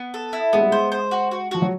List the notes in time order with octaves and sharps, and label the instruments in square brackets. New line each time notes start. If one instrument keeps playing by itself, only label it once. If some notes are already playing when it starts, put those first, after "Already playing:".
Already playing: [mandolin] B3
A4
E4
[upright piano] G#3 [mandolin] B3
[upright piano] G3
[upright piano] G#3 [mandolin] C5
[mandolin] C5
F#4
F#4
[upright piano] F3 [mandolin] F#4
[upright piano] F#3